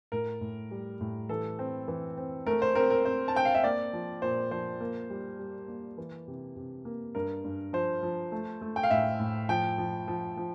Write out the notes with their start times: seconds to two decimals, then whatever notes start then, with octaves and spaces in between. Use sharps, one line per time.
0.12 A2 A#4
0.41 A2
0.71 G3
1.01 A2
1.29 E3 A4
1.59 C4
1.88 E3
2.17 C4
2.47 A3 A#4
2.62 C5
2.75 C4 A#4
2.90 A#4
3.05 C4 C5
3.28 A5
3.34 C4 G5
3.45 F5
3.55 E5
3.64 A#3 D5
3.93 F3
4.22 A#2 C5
4.51 F3 C5
4.81 A#3
5.10 G3
5.39 G3
5.68 A#3
5.98 E3
6.28 C3
6.56 C3
6.85 A#3
7.15 G2 A#4
7.44 G2
7.73 F3 C5
8.03 F3
8.32 A3
8.62 A3
8.76 G5
8.83 F5
8.91 A2 E5
9.20 A2
9.49 F3 G5
9.78 F3
10.08 F3
10.37 F3